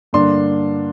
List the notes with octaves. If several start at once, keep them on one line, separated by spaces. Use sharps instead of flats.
G2 D3 A#3 D4 C6